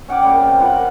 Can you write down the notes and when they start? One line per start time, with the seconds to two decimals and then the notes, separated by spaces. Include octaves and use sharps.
0.08 C#4 F#5 G5 D6
0.22 A#2 C#3 G3
0.41 C3
0.60 F4 B4 F#5
0.73 A#4